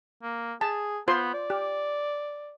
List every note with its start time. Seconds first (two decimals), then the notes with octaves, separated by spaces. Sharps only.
0.23 A#3
0.61 G#4 A5
1.08 B3 F4 C5 C6
1.34 D5
1.50 G4